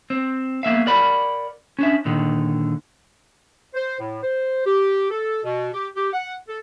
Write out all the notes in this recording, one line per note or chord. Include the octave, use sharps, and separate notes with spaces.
C4
A#3 B3 E5 F5
A#4 D5 F#5 B5
C#4 D4 E5
A#2 D3 D#3
C5
A2
C5
G4
A4
B2
G4
G4
F#5
A4